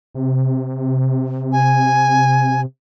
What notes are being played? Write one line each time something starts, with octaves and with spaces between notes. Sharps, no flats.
C3
G#5